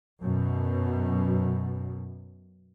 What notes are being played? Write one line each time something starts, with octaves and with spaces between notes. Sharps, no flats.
F#2 B2